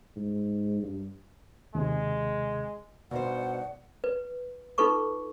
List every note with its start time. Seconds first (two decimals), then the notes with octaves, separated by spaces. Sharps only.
0.16 G#2
0.83 G2
1.75 D#2 C3 G#3
3.11 G2 B2 D#4 C5 D5 F#5
4.04 B4
4.78 D#4 F4 A4 B4 C#6 D6